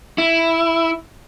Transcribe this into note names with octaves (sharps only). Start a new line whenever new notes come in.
E4